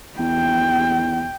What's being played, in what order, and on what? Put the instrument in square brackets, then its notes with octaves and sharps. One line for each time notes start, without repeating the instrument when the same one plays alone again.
[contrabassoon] E2 [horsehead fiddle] G5